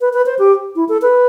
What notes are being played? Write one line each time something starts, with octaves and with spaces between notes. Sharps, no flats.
B4
B4
C5
G4
E4
A4
B4